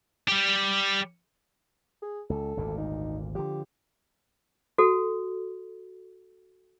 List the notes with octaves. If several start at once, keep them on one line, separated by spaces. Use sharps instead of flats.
G3 G4
G#4
C#2 A4
G#1 D2 A#2
D#4
D3 F3 G4
F#4 A4